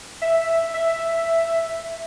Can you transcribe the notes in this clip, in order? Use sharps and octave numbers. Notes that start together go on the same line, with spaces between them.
E5
E5